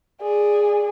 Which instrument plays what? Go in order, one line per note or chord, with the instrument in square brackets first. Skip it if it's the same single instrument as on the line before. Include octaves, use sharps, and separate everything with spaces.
[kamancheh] G#4 D5